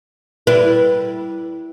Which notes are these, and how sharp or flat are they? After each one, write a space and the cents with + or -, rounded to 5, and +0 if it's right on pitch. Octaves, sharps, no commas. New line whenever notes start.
G3 -15 E4 +0 B4 -10